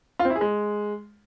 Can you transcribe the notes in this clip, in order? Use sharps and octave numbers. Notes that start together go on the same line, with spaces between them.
F4
C4
E4
G#4
G#3